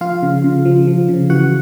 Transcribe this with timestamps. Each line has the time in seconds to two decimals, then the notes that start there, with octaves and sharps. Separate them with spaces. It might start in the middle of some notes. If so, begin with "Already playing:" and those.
0.01 F3 F4 F5
0.22 C#3
0.44 C#3
0.65 F3
0.87 F3
1.08 C#3
1.30 E3 F#4 F#5